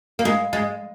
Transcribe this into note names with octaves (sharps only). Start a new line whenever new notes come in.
A#3
G#3
G#3